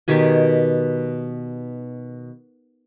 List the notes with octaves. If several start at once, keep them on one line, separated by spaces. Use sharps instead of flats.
B2 D#3 G4 G#5